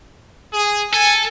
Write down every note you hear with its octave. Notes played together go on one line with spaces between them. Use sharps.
G#4
A4 G#5